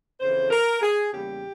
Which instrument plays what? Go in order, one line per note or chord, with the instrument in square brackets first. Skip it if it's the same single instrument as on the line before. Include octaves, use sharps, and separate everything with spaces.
[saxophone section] F2 C#3 E3 C5
A#4
G#4
E2 C#3 G3 A#3 G4